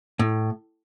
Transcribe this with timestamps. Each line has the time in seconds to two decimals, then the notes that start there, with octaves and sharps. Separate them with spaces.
0.19 A2